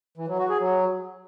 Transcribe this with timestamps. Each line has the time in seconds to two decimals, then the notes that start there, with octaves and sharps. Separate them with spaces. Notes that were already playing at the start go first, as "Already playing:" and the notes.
0.17 E3
0.28 F#3
0.39 F#4
0.49 G#4
0.60 F#3